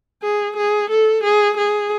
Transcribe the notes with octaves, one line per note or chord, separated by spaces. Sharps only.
G#4
G#4
A4
G#4
G#4